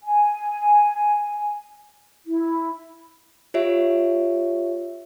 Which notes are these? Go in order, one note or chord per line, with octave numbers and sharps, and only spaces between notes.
G#5
E4
F4 G4 C#5 E5